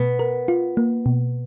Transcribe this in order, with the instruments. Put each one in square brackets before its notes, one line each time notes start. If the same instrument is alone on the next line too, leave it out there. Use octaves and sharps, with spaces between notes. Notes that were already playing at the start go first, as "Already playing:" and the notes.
Already playing: [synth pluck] B2 [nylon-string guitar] B3
[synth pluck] A#4
F4
A#3
B2